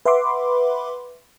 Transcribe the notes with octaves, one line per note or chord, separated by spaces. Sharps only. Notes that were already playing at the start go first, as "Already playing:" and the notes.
B4 E5 F#5 B5 C6 D6